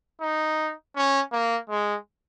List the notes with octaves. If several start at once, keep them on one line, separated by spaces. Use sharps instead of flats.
D#4
C#4
A#3
G#3